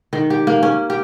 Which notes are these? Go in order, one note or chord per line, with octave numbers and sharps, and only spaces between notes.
D#3
G4
A#3
C#4
G4